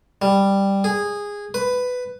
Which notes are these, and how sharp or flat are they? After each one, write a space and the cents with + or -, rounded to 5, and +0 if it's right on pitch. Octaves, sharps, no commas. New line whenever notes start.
G3 +5
G#4 -15
B4 +10